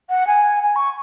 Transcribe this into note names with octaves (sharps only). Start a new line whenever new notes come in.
F#5
G#5
G#5
C#6